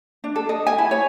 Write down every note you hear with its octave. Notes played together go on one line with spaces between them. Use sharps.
D4
A4
D#5
G#5
E4
C#5